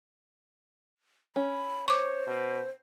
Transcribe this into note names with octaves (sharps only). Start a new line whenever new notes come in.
C#4 B5
C5 C#5 C#6 D6
B2